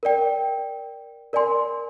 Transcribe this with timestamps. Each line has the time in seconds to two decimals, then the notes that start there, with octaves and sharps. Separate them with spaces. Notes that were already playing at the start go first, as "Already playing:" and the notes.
0.03 A#4 D5 G5
1.33 A#4 D5 G#5 C6